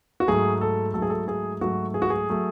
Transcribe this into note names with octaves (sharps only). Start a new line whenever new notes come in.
F#4
G#2 F#3 A3 G#4
A4
G#2 F#3 A3 A4
G#4
A4
G#4
G#2 F#3 A3 F#4
G#4
F#4
G#4
F#3 A3